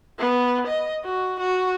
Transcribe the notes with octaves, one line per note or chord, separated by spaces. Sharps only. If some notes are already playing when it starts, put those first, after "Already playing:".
B3
D#5
F#4
F#4